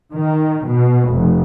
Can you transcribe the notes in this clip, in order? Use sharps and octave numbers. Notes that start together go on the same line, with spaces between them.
D#3
B2
F1